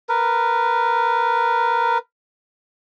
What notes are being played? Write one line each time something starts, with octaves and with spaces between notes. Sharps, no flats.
A#4 B4